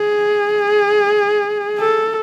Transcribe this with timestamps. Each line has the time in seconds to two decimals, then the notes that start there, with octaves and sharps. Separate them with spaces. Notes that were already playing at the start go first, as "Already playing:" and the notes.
Already playing: G#4
1.79 A4